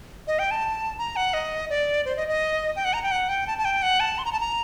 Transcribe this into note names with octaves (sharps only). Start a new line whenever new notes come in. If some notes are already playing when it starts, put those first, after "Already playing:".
D#5
G5
A5
A#5
F#5
D#5
D5
C5
D#5
D#5
G5
F#5
A#5
G5
F#5
G5
A5
A5
G5
F#5
A5
C6
A#5
A5
A#5